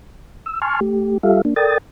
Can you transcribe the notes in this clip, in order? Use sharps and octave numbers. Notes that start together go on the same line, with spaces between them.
E6
G#5 A5 C6 C#6 F6
A3 G4
G3 F4 G4 A4 E5 F5
A#3 D4
A4 A#4 D5 G5 D#6 A6